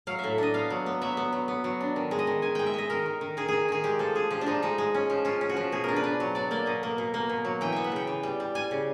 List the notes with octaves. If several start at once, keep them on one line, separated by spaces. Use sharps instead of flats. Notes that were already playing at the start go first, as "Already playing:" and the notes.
F#3 F5
A2 E5
D4 D#5
B3 F5
F#3
B3
F#3 E5
B3
F#3
B3
F#3
D4
D#3
G#3
D#5
D#3
D#3 G#5
G#3 G5
E5
G#3 D#5
D#3 A#4
D#3
D#3
D#3 G#4
D#3 G#4
D#3 G#4
G#3 G4
F3 A4
G#3 G#4
F3 G4
D4
F3 D#4
G#3 D#4
G#3
C#4
F3
C#4 F4
C#4
F#4
F3
B2 G#4
D4 A#4
B4
D4
F#3
F#3 D5
A#3 D5
B2 D#5
A#3
B2
A#3
B2
F#3
E3 G5
B3 E5
F#5
C#3 G5
E3
G3
G3
G3 G#5
C#3